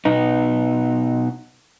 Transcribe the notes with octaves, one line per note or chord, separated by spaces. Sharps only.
B2 B3 D#4